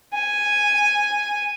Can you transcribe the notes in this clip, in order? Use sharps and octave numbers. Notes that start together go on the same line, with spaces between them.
G#5